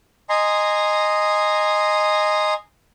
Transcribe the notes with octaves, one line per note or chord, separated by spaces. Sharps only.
D#5 G#5 A#5 C6